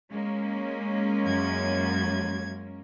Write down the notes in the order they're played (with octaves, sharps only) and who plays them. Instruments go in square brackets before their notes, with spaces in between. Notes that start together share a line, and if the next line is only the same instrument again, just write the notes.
[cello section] G#3 A#3 C#4
[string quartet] F#2 G#6